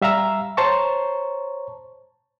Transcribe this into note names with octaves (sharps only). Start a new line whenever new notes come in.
G3 E5 F5 A#5 E6
C5 C#5 A5 A#5 C#6